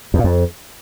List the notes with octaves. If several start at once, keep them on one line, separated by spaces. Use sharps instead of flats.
E2
A#2
F2